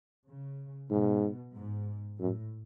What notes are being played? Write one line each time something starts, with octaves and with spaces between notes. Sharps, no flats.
C#3
G#2 B2
G#2
F#2 A2